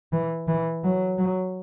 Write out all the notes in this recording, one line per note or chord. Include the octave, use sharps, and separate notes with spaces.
E3
E3
F#3
F#3